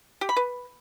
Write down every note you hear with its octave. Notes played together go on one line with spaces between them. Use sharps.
G4
B5
B4